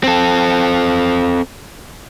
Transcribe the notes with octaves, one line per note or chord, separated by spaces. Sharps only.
C4 A4